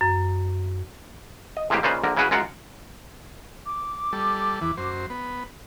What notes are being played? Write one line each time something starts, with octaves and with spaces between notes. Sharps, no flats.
F#2
D#5
A2 C3 E3 G#3 A#3 G4
A#2 C#3 D#4 F4 B4 C5
A#1 D3 A#4
C#3 E4 F#4 G#4 B4
F#2 G#3 F4 A#4 F#5
D6
G3 A4
E2 E3
F#2 C5
B3